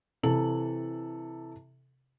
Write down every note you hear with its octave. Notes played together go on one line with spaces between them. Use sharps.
C3 E3 A4 F#7